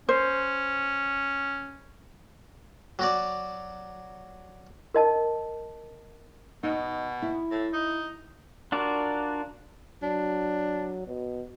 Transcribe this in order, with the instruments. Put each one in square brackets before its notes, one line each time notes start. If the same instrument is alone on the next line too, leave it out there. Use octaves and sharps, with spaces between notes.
[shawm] C#4 [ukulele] C5
[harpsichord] F#3 F#4 D5
[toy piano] A#4 D#5 A5
[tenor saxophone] B2 [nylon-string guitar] D#4
[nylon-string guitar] E4
[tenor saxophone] A2
D#4
[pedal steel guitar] D4 F4 F#4 A#4 D5
[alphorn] F#3 [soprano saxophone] D4
[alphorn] B2